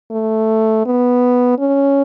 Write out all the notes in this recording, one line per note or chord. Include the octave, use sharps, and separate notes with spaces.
A3
B3
C#4